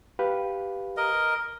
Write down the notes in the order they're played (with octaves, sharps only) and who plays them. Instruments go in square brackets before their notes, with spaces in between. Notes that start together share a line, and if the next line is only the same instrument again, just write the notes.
[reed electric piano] G4 B4 F5
[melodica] A#4 D#5